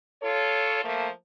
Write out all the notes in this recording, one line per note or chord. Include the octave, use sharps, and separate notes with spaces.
F4 A4 C#5
F3 A3 A#3